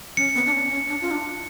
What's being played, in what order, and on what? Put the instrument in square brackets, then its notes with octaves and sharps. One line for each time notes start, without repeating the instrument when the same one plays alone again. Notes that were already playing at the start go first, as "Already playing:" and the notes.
[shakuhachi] C#4 [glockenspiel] C#7
[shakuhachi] B3
D4
C#4
C#4
D4
F4
D4